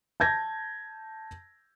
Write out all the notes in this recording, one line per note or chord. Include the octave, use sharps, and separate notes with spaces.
A5 G6 G#6 A#6